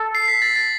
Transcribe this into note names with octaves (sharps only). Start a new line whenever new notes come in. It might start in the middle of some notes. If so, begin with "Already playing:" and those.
Already playing: A4
C7
B6
A6
A6